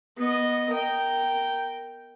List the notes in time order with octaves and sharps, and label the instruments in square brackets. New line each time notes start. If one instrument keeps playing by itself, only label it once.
[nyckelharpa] B3 D#5
A#4 G5